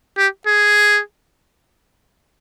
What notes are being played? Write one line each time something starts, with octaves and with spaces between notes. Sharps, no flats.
G4
G#4